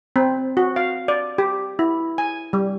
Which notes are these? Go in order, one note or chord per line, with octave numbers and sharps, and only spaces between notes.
C4
F#4
F5
D5
G4
E4
G#5
G3